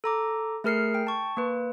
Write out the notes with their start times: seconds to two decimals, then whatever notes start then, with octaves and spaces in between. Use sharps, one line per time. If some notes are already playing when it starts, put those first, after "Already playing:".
0.04 A4 A#5 D6
0.64 A3 G#4 A#4 F6 C7 C#7
0.94 G5
1.07 A5 C#6
1.37 A#3 B4